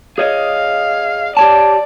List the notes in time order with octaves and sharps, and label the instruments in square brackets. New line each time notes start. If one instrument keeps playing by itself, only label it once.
[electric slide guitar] G#4 C#5 D#5 [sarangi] F5
[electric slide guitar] G4 C#5 A5 [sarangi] D5